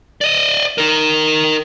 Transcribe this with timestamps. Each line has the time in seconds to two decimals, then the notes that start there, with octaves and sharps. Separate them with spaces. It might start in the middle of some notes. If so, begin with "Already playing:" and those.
0.21 D5 D#5
0.78 D#4 A#4